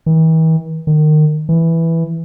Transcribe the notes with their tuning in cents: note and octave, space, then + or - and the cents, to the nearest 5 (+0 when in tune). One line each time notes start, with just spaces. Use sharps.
E3 -45
D#3 -25
E3 +0